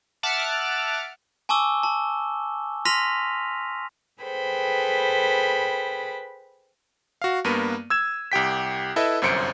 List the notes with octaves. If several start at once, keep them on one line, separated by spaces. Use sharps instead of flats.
E5 F#5 A5 D6 F6
G#5 A5 C#6 D6 E6 G7
A5
C6 F6 A#6 B6 D#7 F7
G#4 A4 B4 C5 G5 B5
F#4 F5
G2 A#3 B3 D#7
E6 G#6 E7
C2 G4 G5 B6
E4 A4 B4 D#5 E5
G1 C2 F#2 C5 C#7 D7